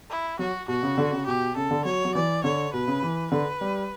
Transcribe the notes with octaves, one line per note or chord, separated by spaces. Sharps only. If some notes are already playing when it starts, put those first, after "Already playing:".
E4
F#3 F#4
B2 F#4
C#3
D3
C#3
B2 G4
C#3 A4
D3
F#3 C#5
F#3
E3 D5
D3 C#5
B2 B4
C#3
E3
D3 B4
G3